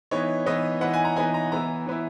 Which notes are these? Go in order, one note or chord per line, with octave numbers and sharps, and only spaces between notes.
E3 B3 D#4 C#5
E3 B3 D#4 D#5
E3 B3 D#4 F#5
G#5
A#5
E3 B3 D#4 G#5
A#5
E3 B3 E4 A#5
E3 B3 E4